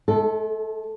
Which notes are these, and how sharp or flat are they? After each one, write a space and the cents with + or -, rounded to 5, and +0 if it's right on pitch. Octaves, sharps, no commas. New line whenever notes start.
A3 -45 A4 +0